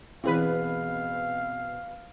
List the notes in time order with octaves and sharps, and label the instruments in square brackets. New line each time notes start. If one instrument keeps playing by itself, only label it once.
[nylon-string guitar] B2 G#4 [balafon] E3 E4 [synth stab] C4 B4 [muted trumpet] F5